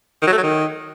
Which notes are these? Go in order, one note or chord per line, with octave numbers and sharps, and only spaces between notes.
D#3
F#3
A3
F#3
D#3